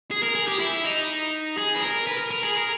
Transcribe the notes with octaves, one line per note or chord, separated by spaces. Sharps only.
G#4
A#4
G#4
G4
E4
D#4
G#4
B4
A#4
B4
A#4
A#4
G#4
A#4